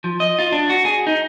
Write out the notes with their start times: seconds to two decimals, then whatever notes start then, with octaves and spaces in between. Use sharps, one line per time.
0.04 F3
0.20 D#5
0.39 F4
0.52 D4
0.70 F#4
0.85 G#4
1.07 D#4